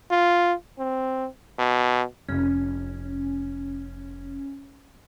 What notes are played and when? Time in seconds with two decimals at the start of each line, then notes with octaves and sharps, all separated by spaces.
0.11 F4
0.78 C4
1.59 B2
2.29 F1 C#4